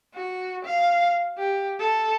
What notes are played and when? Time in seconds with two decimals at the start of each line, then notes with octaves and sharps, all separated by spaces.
0.15 F#4
0.65 F5
1.38 G4
1.80 A4